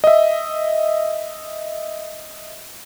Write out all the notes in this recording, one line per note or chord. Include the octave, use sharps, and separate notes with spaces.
D#5 E5